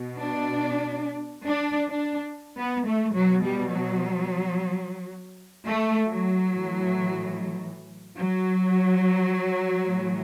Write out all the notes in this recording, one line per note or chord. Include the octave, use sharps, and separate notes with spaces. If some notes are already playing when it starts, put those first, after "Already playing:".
Already playing: B2
D4
D4
D4
B3
A3
B2 F#3
G3
F#3
A3
F#3
A2 E3
F#3
A2 E3